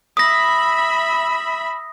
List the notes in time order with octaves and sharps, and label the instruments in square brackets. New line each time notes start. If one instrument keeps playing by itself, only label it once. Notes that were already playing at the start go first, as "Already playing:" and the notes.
[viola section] E5 B5 [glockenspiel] D#6 A#6